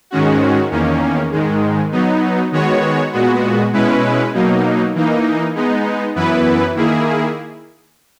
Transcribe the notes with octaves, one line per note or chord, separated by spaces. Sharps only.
G#2 D#3 G#3 C#4 F#4
E2 D#3 A#3 C#4
G#2 D#3 G#3
F#3 B3 D#4
D#3 G#3 B3 F#4 C#5
A#2 G#3 B3 F#4
B2 G#3 C#4 E4 B4
B2 F#3 A#3 D#4
E3 A#3 D#4
G#3 B3 D#4
F#2 E3 B3 E4 B4
D#3 A#3 E4 G#4